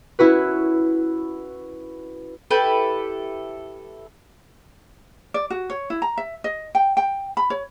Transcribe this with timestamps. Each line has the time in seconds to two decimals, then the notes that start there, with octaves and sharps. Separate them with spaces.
0.19 C#4 E4 F#4 B4
2.51 E4 G4 A4 B4
5.34 D5
5.50 F#4
5.70 C#5
5.90 E4
6.02 A#5
6.18 E5
6.44 D#5
6.75 G5
6.97 G5
7.37 B5
7.50 C#5